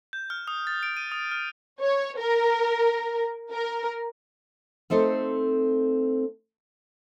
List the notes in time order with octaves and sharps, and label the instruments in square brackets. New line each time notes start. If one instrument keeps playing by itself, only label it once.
[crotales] G6
F6
D#6
A6
D7
D#7
D#6
F6
[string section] C#5
A#4
A#4
[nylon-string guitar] A3 C4 D#4 A4 C5